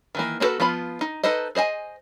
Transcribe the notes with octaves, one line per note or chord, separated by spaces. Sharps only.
D#3 E3 A#3
A#3 D4 F#4 A4 B4
F3 B3 F4 B5
D#4
D#4 A4 B4 C5 D#5
G#4 C5 D#5 G#5